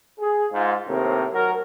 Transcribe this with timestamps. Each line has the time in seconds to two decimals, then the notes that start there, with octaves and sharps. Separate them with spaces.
0.19 G#4
0.51 G#2 F4
0.87 D#2 A2 C3 C4 A#4
1.31 F#3 F#4 A#4